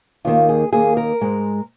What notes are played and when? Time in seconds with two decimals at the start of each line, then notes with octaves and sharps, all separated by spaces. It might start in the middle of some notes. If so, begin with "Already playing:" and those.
0.25 D#2 D#3 A#3 F4
0.49 G#4
0.73 D#2 D#3 A#3 G#4
0.97 A#4
1.21 G#2 G#3